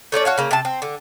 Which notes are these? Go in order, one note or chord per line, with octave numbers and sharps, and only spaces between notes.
A3 C#4 C#5 D5
F#4 C#5 F5
C#3 A#3
C3 A5
C4
D3